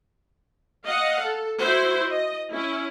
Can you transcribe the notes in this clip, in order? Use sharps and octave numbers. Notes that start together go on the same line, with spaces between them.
D#5 F5 F#5
A4
E4 F#4 C5
D#5
C#4 E4